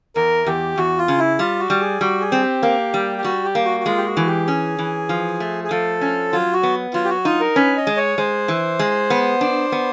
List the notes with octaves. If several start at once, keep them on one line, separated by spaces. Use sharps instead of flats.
E2 A#4
E2 G4
E2 F#4
F4
C#3
E4
G3 F4
F#4
G3
G#4
G3 F#4
G#4
C4
G4
A#3
G3
G4
G3 F#4
G4
A#3
F#4
F#4
G#3 F4
G4
F#4
E3
G4
C#4 G#4
E3
F3
A3
G#4
F3 A4
C#4
F#3 F4
F#4
B3
F#3 F4
G4
F#4
D#4 F4
A#4
C#4 B4
D#5
G#3
C#5
G#3 C5
E3
G#3
B3
D4
B3